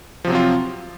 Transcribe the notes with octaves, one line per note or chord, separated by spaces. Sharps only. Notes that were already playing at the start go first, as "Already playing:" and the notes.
C3 F3 F#3 C4 F4